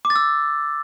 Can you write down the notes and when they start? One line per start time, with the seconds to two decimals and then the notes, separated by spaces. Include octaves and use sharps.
0.05 D6
0.10 A6
0.16 E6